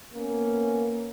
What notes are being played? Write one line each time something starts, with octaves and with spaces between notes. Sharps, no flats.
A#3 B3 C#4